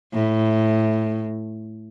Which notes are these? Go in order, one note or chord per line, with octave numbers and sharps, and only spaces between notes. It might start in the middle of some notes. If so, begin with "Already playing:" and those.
A2